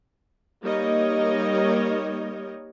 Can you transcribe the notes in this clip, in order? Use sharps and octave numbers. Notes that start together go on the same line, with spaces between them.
G3 A#3 D#4 A#4 C#5 D#5